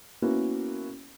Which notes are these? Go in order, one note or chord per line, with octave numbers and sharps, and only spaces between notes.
A#3 B3 C#4 E4 F#4